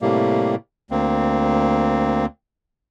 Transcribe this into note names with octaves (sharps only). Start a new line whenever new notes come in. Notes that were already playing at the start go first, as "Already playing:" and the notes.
A2 C3 G3 A#3
D2 A#3 C4